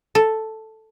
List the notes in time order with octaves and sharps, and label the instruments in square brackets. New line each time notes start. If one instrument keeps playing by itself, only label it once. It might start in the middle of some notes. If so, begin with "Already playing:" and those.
[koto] A4